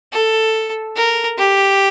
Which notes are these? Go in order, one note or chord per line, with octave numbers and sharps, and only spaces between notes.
A4
A#4
G4